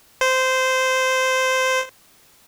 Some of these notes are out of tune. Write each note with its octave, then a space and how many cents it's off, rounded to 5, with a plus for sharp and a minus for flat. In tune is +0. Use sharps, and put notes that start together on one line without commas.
C5 -15